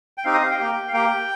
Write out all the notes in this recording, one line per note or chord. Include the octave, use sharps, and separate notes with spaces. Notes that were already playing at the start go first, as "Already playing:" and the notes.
G5
C4 D#4 G4 F5
D#5
F5
G5
A#3 G4
F5
A#3 G4 G5